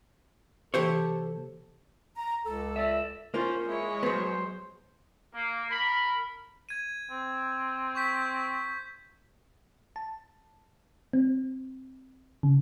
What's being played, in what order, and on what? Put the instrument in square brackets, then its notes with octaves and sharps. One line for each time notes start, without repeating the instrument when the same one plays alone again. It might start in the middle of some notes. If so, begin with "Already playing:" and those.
[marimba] C3 E3 A#3 [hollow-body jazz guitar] G4 C5 C#5 [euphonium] A4
[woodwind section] A#5
C#2 A4
[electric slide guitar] D5 E5
[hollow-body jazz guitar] A#3 F4 [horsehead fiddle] C#4 [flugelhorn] C5
[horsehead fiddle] G#3 C#5 [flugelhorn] E4
[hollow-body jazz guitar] F#3 B3 [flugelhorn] C5
[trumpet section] A#3
A#4 B5
[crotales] G#6 D#7
[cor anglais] C4
[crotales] C#6 G6 B6
[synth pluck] A5
C4
C#3